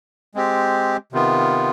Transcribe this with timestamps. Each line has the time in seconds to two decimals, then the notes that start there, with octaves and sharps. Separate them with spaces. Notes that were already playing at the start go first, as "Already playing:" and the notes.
0.35 G#3 C4 G4
1.13 C3 D#3 B3 F4